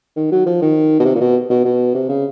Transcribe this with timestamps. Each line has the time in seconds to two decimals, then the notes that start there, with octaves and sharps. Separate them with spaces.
0.16 D#3
0.32 F#3
0.46 F3
0.62 D#3
1.00 B2
1.05 C3
1.15 A#2
1.21 B2
1.50 B2
1.65 B2
1.95 C3
2.09 C#3